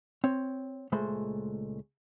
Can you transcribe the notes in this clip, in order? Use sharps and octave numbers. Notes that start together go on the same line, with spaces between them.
C4 C#5
C#2 A#2 G#3 A3 C5 B5